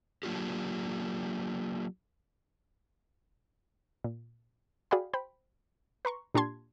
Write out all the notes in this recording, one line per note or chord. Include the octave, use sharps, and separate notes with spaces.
F#3 A#3 D4 F4 G4
A#2
F#4 G#4 D5 F5 G5 B5
C5 G5 B5
B4 A#5 C6 C#6
A#2 D4 G4 A5 C6 G#6